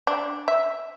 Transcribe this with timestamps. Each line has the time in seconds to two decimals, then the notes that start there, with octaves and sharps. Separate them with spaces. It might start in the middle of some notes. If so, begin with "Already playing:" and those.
0.07 D4
0.48 E5